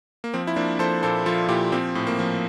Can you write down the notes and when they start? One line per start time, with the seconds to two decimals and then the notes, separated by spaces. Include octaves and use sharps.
0.24 A#3
0.34 F3 C4
0.47 E4
0.56 F3 A#3 D4
0.79 F3 A4 C5
1.02 A#2 A4 C5
1.26 F3 F4 A4
1.48 A#2 E4 G4
1.72 F3 C4
1.95 A2
2.07 A#3
2.19 F3